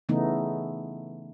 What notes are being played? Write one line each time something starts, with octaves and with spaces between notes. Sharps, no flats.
C#3 E3 A3 B3 D#4